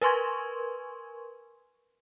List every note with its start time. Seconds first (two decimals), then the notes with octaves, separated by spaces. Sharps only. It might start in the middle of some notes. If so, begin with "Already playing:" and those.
0.02 A#4 B4 G#5 C6 C#6 G#6